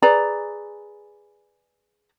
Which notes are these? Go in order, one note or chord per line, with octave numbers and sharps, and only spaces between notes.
G#4 B4 D5 A#5